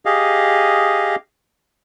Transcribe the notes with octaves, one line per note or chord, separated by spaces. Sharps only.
G4 G#4 D#5 F5